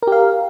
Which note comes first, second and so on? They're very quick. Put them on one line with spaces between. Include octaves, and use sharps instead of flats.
A#4 G4 F5